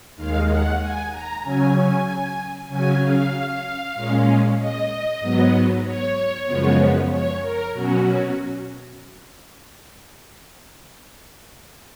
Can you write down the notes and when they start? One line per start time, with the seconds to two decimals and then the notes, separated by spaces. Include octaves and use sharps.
0.16 D#2 D#3 G#3 F5
0.49 F#5
0.79 G#5
1.11 A#5
1.43 C#3 F#3 C#4 G#5
2.68 C#3 F#3 C#4 G#5
3.01 F5
3.95 A#2 G#3 C#4
4.58 D#5
5.20 G#2 F#3 B3
5.84 C#5
6.46 F#2 C#3 F3 G#3 B3
7.10 C#5
7.41 A#4
7.72 B2 F#3 C#4 F#4